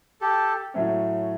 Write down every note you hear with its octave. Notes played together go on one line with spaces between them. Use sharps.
G4 A4
A2 F#3 A3 C#4